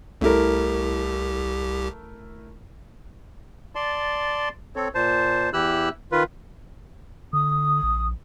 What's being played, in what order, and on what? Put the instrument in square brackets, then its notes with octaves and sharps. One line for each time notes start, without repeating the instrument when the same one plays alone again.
[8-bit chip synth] C2 G4 [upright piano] A3 E4 A#4
[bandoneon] D5 A5 C6
C4 A4 C#5
A#2 C5 A5
E2 E3 E4 G4 E6 F#6
D#3 F4 B4
[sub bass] D3 [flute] D#6
[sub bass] A#1